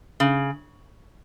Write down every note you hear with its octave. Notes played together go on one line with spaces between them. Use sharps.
C#3